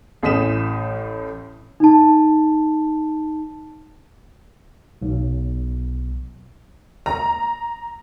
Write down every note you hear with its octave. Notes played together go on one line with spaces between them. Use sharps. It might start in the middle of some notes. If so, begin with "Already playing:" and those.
A1 A2 D#6 B6 E7
D#4 A5
B1
A#5